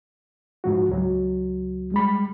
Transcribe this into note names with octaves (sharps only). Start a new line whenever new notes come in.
G#2 F3 F#4
C#2 F#3
G3 G#3 B5